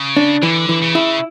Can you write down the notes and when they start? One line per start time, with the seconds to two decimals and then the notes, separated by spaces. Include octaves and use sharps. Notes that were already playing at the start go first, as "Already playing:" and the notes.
Already playing: C#3
0.17 D4
0.43 D3 E3
0.69 E3
0.82 C#3
0.95 E4